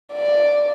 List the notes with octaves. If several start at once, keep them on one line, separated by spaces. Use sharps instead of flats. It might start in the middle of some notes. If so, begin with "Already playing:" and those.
D5